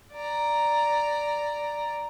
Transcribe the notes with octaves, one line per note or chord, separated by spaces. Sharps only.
D5 A#5